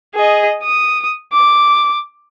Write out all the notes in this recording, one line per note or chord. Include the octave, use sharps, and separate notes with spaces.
G#4 D#5
D#6
D6